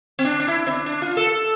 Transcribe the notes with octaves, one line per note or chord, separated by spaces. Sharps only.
C4
D4
D4
E4
C4
D4
D4
F4
A4